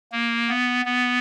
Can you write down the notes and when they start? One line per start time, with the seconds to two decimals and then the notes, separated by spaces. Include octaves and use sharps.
0.12 A#3
0.49 B3
0.85 B3